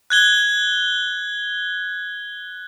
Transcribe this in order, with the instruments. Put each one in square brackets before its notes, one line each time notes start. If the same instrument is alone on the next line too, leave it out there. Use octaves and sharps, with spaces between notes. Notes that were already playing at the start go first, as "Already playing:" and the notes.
[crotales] F#6 G#6 G7